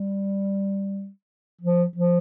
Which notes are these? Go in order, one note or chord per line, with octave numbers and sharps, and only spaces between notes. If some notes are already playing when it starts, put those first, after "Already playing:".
Already playing: G3
F3
F3